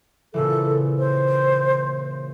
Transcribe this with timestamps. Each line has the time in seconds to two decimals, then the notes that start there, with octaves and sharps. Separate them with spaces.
0.34 A#2 C#3 E3 A4
0.99 C5